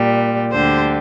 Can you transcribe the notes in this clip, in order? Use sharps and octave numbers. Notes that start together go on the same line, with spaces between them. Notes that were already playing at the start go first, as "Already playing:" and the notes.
Already playing: A#2 G3
D2 D3 G3 C5